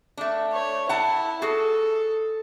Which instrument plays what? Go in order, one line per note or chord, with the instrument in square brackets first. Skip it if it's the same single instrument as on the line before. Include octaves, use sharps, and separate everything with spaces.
[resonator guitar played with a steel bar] A3 D4
[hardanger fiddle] C#5
[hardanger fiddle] E4 [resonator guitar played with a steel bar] F#5 A5
[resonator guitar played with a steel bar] F#4 G#4 [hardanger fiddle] A4